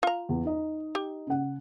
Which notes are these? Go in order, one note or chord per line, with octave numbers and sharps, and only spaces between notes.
F4 A#5
E2
D#4 D#5
G4
C#3 F#5